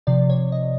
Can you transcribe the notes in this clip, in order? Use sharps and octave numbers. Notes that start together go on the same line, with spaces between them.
C3 F3 D5
C#5
D#5